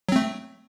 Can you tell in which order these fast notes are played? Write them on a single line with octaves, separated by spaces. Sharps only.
F#3 C4 A3